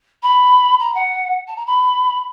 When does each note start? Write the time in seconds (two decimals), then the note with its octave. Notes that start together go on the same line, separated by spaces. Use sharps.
0.23 B5
0.80 A#5
0.95 F#5
1.48 A5
1.56 A#5
1.67 B5